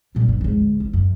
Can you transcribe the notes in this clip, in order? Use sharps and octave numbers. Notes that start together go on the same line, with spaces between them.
A#2 G3
G2
G#1 D2
D2
F#2